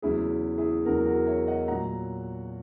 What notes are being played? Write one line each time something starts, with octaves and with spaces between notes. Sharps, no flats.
E2 C#3 F#3 E4 G#4
E4 G#4
E2 C#3 F#3 F#4 A#4
F#4 A#4
C#5 E5
D#5 F#5
A#2 F#3 F#5 A#5